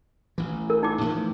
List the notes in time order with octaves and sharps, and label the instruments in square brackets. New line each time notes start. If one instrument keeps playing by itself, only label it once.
[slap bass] A1 E3
[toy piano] A#4
D#4 D6
[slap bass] A2 E3 F3